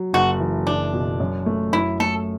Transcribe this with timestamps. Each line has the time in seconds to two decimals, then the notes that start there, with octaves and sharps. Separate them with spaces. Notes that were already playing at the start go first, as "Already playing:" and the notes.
Already playing: F#3
0.13 F#1 F#4
0.40 E3
0.67 F#1 D4
0.94 B2
1.20 F#2
1.46 A3
1.73 F#2 E4
2.00 A3 A4